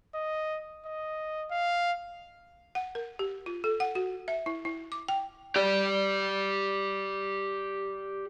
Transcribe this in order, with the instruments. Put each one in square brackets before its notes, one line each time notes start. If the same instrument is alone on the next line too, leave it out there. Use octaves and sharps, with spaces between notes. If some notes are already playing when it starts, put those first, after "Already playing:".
[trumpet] D#5
D#5
F5
[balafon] F#5
A#4
G4
F4
A4
F#5
F#4
E5
E4
E4
D6
G5
[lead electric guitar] G4 D5